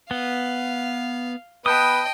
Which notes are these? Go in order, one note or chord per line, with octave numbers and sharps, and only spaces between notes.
B3 F5 G7
B3 B4 D#5 G5 A5 D#6 G6 G7